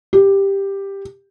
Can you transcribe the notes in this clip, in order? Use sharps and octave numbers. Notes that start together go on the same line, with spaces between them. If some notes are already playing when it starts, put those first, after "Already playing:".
G4